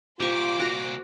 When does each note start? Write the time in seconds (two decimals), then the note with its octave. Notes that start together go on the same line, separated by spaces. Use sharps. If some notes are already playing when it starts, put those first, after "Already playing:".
0.20 C2 A#2 F4 G4 C5 C#6 D6
0.59 F#4 A#5